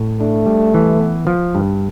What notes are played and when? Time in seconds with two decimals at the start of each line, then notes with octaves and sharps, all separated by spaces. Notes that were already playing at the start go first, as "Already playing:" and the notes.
Already playing: A2
0.21 A3 D4
0.46 G3
0.74 E3
1.00 B3
1.27 F3
1.55 G2